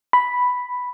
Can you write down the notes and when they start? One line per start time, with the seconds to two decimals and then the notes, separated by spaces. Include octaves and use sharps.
0.13 B5